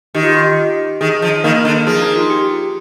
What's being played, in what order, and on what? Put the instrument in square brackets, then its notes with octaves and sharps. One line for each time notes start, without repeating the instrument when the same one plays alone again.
[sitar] D#3 [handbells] G4
[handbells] F4
G4
[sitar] D#3 [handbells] G#4
[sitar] F3
[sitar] D#3 [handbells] A#3 A#4
[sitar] D3
[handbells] A#4
[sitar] F3 [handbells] G#4
[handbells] D#4
F4
G4